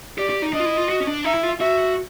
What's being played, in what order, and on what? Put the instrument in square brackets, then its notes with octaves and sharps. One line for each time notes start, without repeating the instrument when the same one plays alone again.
[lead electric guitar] G4 [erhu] D5
[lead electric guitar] G4
D#4
[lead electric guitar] D4 [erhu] D#5
[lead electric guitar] F4
E4
F4
F#4
C#4
D4
[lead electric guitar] D#4 [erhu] E5
[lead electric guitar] E4
F4
[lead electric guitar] F#4 [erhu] E5